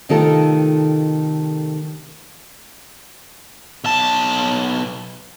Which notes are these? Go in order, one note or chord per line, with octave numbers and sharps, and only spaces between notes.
C3 D#3 A3 D#4 F4 A4
B1 A5